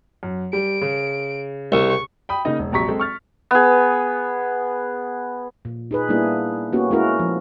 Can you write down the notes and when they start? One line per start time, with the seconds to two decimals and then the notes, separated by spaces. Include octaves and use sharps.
0.23 F#2
0.53 G3 D7
0.81 C#3
1.72 C2 C#6
2.29 G5 B5 D#6
2.45 C#3 A#3 D#4 D#5
2.59 E1
2.72 A#1 C3 F#3 A#5 C#6 B6
2.88 G#3 C4 A4
3.00 C#6 F6 A6
3.51 B3 G#4
5.65 A#2
5.91 D#4 G#4 B4
6.09 G3 A#3 B3 D4 E4 G#4
6.73 A#3 B3 C#4 F#4 G4
6.91 G#3 C#4 E4 F#4 A#4
7.19 F3